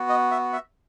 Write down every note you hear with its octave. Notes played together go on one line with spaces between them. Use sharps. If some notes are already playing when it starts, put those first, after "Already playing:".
Already playing: B3 F#4
D#5
E5
E5